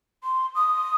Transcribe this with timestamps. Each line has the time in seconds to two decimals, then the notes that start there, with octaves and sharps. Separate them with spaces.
0.24 C6
0.55 D#6